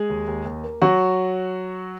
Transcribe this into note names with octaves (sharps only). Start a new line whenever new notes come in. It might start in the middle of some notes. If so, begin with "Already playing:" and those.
Already playing: G#3 G#4
D#2
D#2
D#2
A#3
F#3 F#4